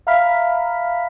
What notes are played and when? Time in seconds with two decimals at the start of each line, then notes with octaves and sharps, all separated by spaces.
0.07 E5 F5 A#5 B5 F6 B6